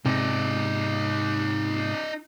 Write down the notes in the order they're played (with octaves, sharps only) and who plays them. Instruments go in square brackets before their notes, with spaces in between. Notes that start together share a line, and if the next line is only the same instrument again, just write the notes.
[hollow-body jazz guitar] G#2 C3 [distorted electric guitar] D#4 D5